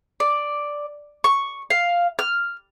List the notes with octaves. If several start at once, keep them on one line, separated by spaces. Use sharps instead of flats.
D5
C#6
F5
F6